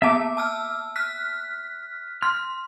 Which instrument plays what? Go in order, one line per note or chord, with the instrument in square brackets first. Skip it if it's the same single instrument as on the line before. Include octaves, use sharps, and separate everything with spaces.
[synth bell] A#3 B3 A5 [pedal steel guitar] E5 D6
[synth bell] A5 E6 F6
F6 F#6 B6
[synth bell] C6 [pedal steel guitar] F6